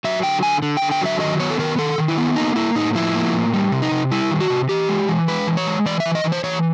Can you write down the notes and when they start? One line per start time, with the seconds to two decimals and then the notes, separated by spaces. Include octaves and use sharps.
0.04 F#3 E5
0.23 D3 G5
0.43 D3 G#5
0.62 D3
0.77 D3 G5
0.91 G5
1.01 F#3 E5
1.20 D#3 D#5
1.39 B3 C#5
1.50 A4
1.59 D#3 A#4
1.78 D#3 A4
1.98 D#3
2.08 E4
2.18 B3
2.36 A#3 D#4
2.56 A#3 E4
2.75 A2 D#4
2.95 F3 E4
3.15 A#3
3.34 A2
3.53 G3
3.72 C3
3.82 D#4
3.91 C3
4.11 G3 E4
4.31 D#3
4.40 F#4
4.50 C3
4.69 E3 G4
4.89 G#3
5.09 E3
5.28 G#3 B4
5.47 E3
5.57 C#5
5.67 G#3
5.86 E3 D5
6.00 E5
6.06 E3
6.15 D#5
6.24 E3
6.32 C5
6.44 E3 C#5